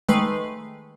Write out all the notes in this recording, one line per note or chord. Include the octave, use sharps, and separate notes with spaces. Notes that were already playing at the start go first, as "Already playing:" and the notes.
D#3 G#3 A3 B4 C7